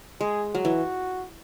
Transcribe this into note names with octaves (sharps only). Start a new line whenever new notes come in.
G#3 G#4
F#3 F#4
E3